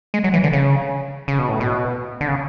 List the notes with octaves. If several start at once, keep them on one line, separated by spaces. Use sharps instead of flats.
G#3
F#3
E3
D3
C#3
C#3
B2
A2
B2
D3
C#3